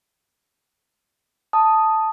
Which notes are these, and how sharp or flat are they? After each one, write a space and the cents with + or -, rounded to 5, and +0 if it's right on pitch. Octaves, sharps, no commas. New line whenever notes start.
A5 +0 D#6 +0